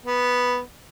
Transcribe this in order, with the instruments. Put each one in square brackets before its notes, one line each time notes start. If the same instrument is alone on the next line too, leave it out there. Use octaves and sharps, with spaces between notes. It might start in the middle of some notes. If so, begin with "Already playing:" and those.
[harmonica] B3